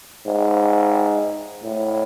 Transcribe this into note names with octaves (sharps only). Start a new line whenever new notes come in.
G#2
A2